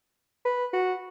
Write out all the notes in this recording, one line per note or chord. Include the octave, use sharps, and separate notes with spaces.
B4
F#4